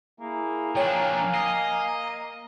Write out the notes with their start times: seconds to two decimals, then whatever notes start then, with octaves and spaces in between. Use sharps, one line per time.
0.20 A#3 E4 G#4
0.75 F3 D4 C#5 F5 G5 G#5 A#5
1.34 D#5 C7